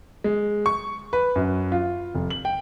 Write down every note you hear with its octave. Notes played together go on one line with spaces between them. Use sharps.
G#3
C#6
B4
F#2
F4
F1
F#7
G5